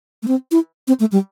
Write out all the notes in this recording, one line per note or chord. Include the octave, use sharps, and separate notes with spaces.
A3
C4
E4
C4
A3
G3